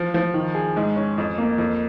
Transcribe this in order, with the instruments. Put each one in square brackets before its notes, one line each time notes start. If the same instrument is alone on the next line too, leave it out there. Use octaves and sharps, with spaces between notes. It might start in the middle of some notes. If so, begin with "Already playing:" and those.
Already playing: [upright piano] F3
F3
D#3
G#4
G#2
C#4
F2
A#3
F2